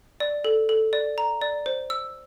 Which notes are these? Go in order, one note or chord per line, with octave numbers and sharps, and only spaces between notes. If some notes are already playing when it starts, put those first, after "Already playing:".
D5
A4
A4
D5
A#5
D5
C5
E6